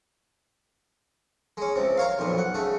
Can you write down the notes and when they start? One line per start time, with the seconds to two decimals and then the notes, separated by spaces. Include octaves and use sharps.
1.57 G#3 C#4
1.75 C#2 C3
1.97 A#4 C#5 F5
2.19 B1 F2 A#2
2.38 F#5
2.54 C#3 A3